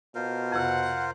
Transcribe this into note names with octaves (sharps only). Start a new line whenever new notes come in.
B2 F4 A#4 C5
F2 C3 F#5